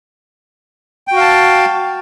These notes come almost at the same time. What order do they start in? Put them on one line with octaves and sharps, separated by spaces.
G5 F#4 F5 A5